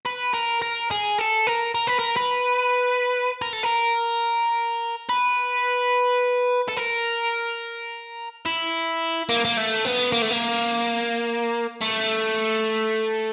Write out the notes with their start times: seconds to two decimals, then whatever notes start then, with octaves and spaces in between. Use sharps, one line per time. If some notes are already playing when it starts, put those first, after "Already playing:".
0.06 B4
0.34 A#4
0.62 A#4
0.91 G#4
1.18 A4
1.47 A#4
1.75 A#4
1.87 B4
1.99 A#4
2.16 B4
3.42 A#4
3.53 A4
3.63 A#4
5.09 B4
6.69 A4
6.77 A#4
8.46 E4
9.29 A#3
9.45 A#3
9.57 A3
9.85 B3
10.12 A#3
10.22 A3
10.31 A#3
11.81 A3